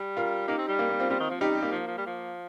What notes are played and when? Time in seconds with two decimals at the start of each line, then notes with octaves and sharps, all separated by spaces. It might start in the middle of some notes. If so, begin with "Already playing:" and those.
Already playing: G3
0.17 F4 A#4
0.48 A#3 D#4 G4
0.59 C4
0.69 G3
0.79 A#3
0.89 A#3
1.00 C4 F4
1.10 G3 C4 F4
1.20 D#3
1.31 F3
1.41 G3 D#4 G4
1.62 A#3
1.72 F3
1.87 F3
1.98 G3
2.07 F3